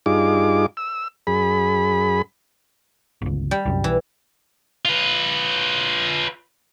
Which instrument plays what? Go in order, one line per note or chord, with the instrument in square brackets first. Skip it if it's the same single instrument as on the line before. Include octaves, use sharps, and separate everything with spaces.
[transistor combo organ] G2 D#4 F4 G#4 D6
E6
F#2 G#4 B5
[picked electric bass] G1 C#2
[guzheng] G3
[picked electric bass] C2 F#2
[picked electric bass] B1 [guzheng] E3
[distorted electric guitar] F4 B4